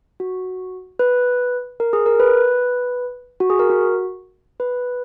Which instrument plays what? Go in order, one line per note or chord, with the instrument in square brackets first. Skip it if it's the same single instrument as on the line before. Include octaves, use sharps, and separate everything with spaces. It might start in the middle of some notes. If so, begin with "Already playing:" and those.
[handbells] F#4
B4
A#4
G#4
A#4
B4
F#4
G#4
A#4
F#4
B4